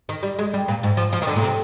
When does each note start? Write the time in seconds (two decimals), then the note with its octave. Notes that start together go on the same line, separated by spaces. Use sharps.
0.09 D#3
0.23 G3
0.39 G#3
0.54 G3
0.68 A#2
0.83 G#2
0.97 F3
1.13 F3
1.22 D#3
1.27 D3
1.36 A#2
1.42 C3